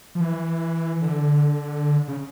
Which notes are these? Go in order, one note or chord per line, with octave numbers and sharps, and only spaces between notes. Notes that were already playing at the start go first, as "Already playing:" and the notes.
F3
E3
D3
C#3